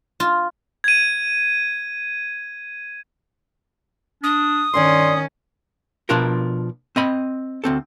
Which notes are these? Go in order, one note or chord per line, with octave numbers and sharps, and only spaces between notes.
F4
G#6 D#7
D4 D#6
G2 D#3 C#4 D4 D5 C6
B2 F3 D4 F4 A#4
C4 D#5 B5
D2 C4 A4